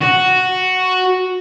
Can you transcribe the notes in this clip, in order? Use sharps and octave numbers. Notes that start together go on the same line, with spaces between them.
F#4